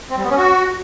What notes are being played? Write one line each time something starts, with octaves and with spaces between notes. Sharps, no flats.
C4
G3
B3
C#4
F#4